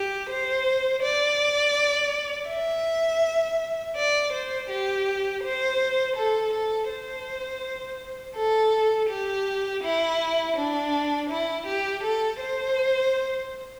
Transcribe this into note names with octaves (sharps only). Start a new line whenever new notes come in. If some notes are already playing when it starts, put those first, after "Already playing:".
Already playing: G4
C5
D5
E5
D5
C5
G4
C5
A4
A4
C5
A4
G4
E4
D4
E4
G4
A4
C5